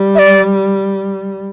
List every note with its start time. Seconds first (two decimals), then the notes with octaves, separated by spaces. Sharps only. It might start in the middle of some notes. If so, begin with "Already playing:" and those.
Already playing: G3
0.15 E5
0.19 D5